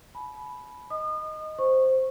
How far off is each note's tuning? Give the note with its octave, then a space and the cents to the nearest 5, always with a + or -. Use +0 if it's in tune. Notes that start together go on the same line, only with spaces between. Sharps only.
G#5 +45 B5 +0
D#5 +0 D#6 -35
C5 +0 C#6 -15